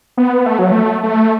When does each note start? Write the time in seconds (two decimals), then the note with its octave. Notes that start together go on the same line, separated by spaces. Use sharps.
0.17 B3
0.46 A3
0.59 F#3
0.72 A3
1.03 A3